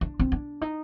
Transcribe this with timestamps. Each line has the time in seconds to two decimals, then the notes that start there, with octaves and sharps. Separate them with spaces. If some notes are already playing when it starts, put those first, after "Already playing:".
0.01 D4
0.19 C4
0.32 D4
0.61 D#4